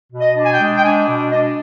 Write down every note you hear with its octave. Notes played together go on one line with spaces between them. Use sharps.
B2
D#5
D4
G#5
G5
G#3
G5
D4 G#5
B2
D4 D#5